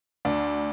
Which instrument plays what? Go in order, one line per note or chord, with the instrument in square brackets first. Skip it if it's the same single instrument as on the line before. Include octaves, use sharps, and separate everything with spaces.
[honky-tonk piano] D2 [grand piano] D4